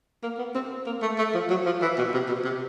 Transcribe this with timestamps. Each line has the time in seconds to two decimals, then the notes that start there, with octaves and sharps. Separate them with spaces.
0.23 A#3
0.38 B3
0.55 C4
0.86 A#3
1.02 A3
1.18 A3
1.34 F3
1.50 F#3
1.66 F3
1.82 E3
1.98 B2
2.13 C3
2.29 B2
2.44 C3